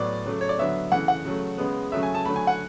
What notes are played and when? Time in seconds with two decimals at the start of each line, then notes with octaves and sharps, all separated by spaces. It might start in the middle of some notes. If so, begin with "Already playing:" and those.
Already playing: A2 F#3 B3 D5
0.26 C#3 F#3 A3
0.41 C#5
0.49 D5
0.58 D3 F#3 B3 E5
0.92 C#3 E3 A3 F#5
1.08 F#5
1.25 C#3 F#3 A3
1.58 C#3 G#3 B3
1.92 C#3 F#3 A3 E5
2.03 G#5
2.15 A5
2.25 D3 F#3 A3 B5
2.36 G#5
2.47 F#5